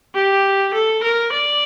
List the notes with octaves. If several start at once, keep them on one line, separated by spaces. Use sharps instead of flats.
G4
A4
A#4
D5